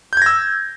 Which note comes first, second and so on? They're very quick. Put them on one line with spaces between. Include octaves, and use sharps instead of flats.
G6 G#6 A#6 E6